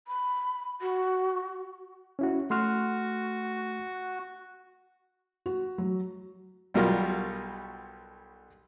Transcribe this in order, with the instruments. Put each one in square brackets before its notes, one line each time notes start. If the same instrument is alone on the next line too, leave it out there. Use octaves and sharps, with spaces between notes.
[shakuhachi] B5
F#4
[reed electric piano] C#4 E4 F#4
[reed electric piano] A3 C6 F6 [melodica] F#4
[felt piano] F#4
F#3
[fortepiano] B1 B2 G3 F4 F#4 A#4